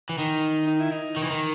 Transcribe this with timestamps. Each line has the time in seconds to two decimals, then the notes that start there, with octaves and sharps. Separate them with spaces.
0.09 E3
0.18 D#3 D#4
0.67 D#4
0.79 E4
0.92 D#4
1.17 D#3
1.23 E3
1.31 D#3